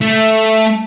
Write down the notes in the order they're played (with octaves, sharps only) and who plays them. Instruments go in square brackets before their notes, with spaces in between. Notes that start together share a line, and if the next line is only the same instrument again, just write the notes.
[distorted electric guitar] A3